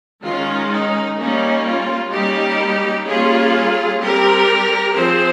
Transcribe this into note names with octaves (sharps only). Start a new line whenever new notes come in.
D#3 G#3 C#4 F4
D#4
G3 A#3 C#4 D#4
F4
G3 A#3 C#4 D#4 G4
G3 A#3 C#4 F4 G#4
G3 C4 G4 A#4
F3 C4 G#4 C5